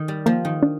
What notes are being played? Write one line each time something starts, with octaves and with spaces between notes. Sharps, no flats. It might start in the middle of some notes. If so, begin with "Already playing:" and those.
Already playing: D#3
G3
F3 A#3
D#3
D4